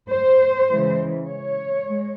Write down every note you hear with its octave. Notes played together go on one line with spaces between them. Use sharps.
C5
C#3 E3 G#3
C#5
G#3